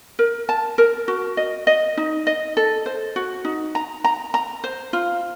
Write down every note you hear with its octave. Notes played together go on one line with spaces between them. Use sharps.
A#4
A5
A#4
F#4
D#5
D#5
D#4
D#5
A4
C5
F#4
D#4
A#5
A#5
A#5
C5
F4